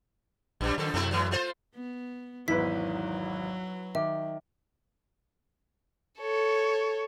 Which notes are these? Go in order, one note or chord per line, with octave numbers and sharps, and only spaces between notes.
A#1 F#2 G3
F#2 D#3 F3 A4
F#2 B2 A3 E4
G#2 E3 F#3
A3 F4 C5
B3
G#1 E2 G#2 F#3 E4 B4 B6
D#3 E5 D6
A4 C#5